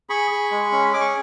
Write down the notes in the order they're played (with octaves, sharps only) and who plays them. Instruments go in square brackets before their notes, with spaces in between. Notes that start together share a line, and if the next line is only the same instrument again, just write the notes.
[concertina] G#4 B5 C#6
G#4
G#3
C#4
G#4 D6
C#6